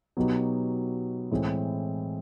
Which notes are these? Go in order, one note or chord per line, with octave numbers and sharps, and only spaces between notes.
B2 F#3 B3 D#4 G4
A2 E3 G#3 C4